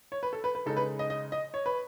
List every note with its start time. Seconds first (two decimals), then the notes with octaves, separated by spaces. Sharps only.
0.12 C#5
0.23 B4
0.33 A4
0.44 B4
0.55 B4
0.66 C#3 G#3 D#4 A4
0.77 B4
0.99 D#5
1.10 D#5
1.32 D#5
1.54 C#5
1.66 B4